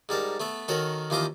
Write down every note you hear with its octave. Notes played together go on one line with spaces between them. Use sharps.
G#2 G3 A#4 A5
A3 B3 E5
D#3 F#4 A4 A#4 C#5
D#2 E3 F3 C5 D#5 D6